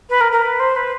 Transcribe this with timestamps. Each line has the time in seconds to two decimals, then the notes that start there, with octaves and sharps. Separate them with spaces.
0.09 B4
0.21 A#4
0.32 A#4
0.42 B4
0.59 C5
0.76 B4